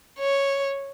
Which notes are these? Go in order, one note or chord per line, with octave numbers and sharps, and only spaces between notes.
C#5